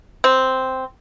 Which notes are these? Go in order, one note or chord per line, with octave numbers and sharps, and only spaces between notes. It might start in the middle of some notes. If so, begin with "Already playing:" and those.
C4